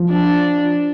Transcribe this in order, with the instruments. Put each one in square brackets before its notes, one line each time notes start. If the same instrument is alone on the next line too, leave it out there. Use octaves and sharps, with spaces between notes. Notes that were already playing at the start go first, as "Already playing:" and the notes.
Already playing: [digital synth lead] F3
[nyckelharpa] D4